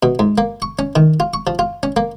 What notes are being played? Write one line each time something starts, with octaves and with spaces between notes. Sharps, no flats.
B2
G#2
A#3
C#6
C#4
D#3
F4
C#6
F3
F4
C#4
A#3